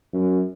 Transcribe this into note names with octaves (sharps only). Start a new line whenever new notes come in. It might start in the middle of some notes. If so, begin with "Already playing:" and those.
F#2